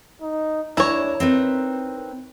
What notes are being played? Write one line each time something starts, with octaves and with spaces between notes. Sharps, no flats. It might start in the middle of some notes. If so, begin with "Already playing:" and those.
D#4
D#2 D4 E4 C#5 A#5
C4 D#4 A#4 B4